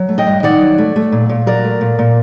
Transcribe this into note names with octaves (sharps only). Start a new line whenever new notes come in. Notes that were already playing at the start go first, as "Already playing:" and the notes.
Already playing: F#3
A3
D#5 G5
G2
D#3 D5 F#5
F#3
A3
A3
A#2
A#2
F#3 A#4 D5
A3
A#2
A#2